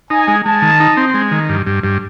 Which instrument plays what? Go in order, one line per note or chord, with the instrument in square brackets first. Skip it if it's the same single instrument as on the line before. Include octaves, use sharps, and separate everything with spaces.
[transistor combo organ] D#4 [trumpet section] G#5
[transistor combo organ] G#3
[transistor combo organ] G#3 [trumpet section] A5
[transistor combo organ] D#3
D#4
C4
G#3
D#3
G2
G2
G2